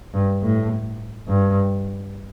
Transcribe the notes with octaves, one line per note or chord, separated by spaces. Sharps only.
G2
A2
G2